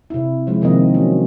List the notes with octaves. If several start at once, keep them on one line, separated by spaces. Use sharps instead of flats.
C3 E4
F3 G#3 E4
C3 D#3 F3 A#3 C4 D#5
F#3 C#4